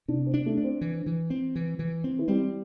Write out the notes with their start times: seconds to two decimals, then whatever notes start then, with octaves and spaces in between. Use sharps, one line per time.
0.08 C3 D4
0.26 C4
0.34 D4
0.46 A3
0.58 D4
0.64 C4
0.81 E3
1.06 E3
1.30 C4
1.56 E3
1.79 E3
2.04 C4
2.19 E3
2.28 G3 C4